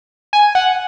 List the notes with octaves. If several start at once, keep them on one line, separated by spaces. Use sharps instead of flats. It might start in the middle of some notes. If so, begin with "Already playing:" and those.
G#5
F#5